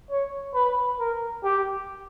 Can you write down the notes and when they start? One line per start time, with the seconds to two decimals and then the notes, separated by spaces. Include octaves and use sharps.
0.11 C#5
0.55 B4
0.99 A#4
1.44 G4